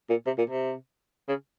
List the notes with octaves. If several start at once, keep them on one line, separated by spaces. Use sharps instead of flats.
A#2
C3
A#2
C3
C#3